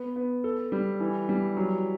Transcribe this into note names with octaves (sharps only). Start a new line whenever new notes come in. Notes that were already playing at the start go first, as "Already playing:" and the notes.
Already playing: B3
B3
A4
G3
E3
G3
F#3